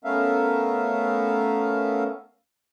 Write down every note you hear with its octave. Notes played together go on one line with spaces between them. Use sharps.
A3 B3 C#4 A#4 E5 F5